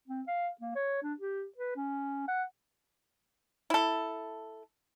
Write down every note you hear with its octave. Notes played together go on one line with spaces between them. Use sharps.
C4
F5
A#3
C#5
D4
G4
B4
C#4
F#5
E4 A4